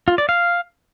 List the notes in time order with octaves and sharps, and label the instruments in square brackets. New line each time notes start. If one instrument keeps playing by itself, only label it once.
[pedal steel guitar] F4
D5
F5